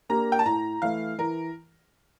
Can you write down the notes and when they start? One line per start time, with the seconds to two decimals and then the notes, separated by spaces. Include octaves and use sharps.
0.09 A#3 D4 G4 A#4 A#5
0.32 G5
0.39 A5
0.46 A2 A#5
0.82 E3 A3 E4 F5
1.18 E3 A#4